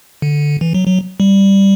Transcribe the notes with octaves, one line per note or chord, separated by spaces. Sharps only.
D3
E3
F#3
F#3
G3